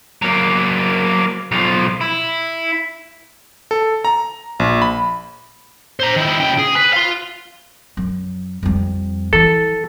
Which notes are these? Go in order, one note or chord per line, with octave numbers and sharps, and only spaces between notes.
F#3 A#3
B1 F3
E4
A4
A#5
A#1
B5
C5 A#5
D#3 E4
C#3 G5
G#4
B4
F5 C6
F#2
F2 G3
E3 A4